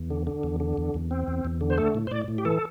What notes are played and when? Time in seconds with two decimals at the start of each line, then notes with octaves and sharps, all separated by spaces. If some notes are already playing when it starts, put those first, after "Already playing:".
Already playing: E2
0.10 D3
0.27 D3
0.43 E2
0.60 D3
0.77 E2
0.94 E2
1.11 C4
1.28 E2
1.45 E2
1.61 D3
1.70 C5
1.78 A3 A4
1.95 A2
2.07 C5
2.11 A2 D5
2.28 A2
2.38 G4
2.45 E3 A4